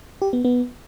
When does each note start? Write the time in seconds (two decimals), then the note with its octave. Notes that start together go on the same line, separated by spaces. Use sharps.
0.22 G4
0.33 B3
0.44 B3